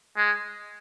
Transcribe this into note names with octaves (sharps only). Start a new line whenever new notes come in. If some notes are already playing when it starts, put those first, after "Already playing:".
G#3